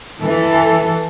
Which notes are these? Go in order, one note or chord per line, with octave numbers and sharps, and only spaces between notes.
E3 A4